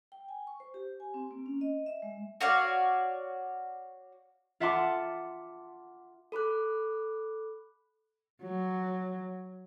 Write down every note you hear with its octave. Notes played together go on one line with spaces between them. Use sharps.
G5
G#5
C#6
C5
G4
G#5
C4
A#3
C#4
D#5
E5
G#3
F#4 C#5 D5 F5
F4 E5 F#5 A5 C6 D6
A4 B5 D6 F#6
F#3